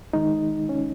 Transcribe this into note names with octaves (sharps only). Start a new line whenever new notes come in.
D#3 G#3 D#4
C#4